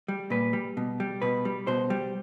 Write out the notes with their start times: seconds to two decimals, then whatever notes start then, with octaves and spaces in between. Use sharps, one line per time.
0.08 G3
0.30 A#2 B4
0.53 G3
0.77 B2
1.00 G3
1.22 B2 B4
1.45 G3
1.67 B2 C5
1.90 G3